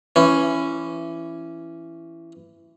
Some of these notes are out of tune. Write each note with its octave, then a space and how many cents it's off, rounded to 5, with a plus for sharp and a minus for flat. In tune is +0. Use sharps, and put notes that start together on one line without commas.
E3 +15 C#4 +0